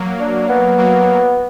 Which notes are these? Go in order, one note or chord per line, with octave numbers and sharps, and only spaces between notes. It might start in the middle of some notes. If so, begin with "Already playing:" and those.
Already playing: F#3 A#3
D4
B3
F#3 A#3